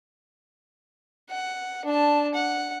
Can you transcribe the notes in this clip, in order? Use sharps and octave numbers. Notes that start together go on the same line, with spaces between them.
F#5
D4 A5
F#5